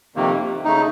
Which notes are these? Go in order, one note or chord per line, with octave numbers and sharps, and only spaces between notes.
F2 C3 D#3 A#3
C#3 A3 D#4